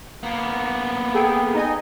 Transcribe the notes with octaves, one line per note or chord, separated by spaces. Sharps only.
A#3 B3
G#4 A4 G5
D#4 D#5 G#5